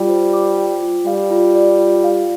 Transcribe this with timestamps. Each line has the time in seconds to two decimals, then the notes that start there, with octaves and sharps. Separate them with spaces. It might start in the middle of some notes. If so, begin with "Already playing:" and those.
Already playing: G3 F4 G5
0.08 C5
0.33 D6
0.57 G5
0.82 F4
1.06 G3 F5
1.31 F4
1.55 D5
1.79 F4
2.04 F5